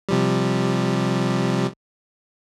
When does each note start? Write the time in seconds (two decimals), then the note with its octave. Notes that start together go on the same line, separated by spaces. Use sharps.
0.09 C3 F3 G3